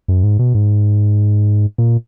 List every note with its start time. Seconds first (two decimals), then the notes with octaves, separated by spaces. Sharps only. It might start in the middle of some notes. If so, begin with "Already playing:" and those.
0.08 F#2
0.23 G#2
0.39 B2
0.55 G#2
1.78 A#2